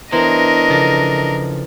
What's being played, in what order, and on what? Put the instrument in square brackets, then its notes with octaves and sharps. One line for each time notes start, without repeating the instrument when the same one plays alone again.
[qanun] E3 [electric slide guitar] B3 C5 [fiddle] D4 A#4 [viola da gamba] D#5
[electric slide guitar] C#3 F3 A4